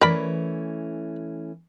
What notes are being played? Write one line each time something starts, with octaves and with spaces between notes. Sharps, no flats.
E3 A3 C#4 A#4 D5 B5